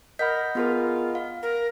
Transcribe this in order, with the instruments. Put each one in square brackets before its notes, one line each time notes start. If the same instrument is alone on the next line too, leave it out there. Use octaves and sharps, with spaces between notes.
[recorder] A#4 [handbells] D#5 F#5 B5 [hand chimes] G6 B6
[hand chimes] B3 G#4 A#4 [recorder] F4
[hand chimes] F5
[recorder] A#4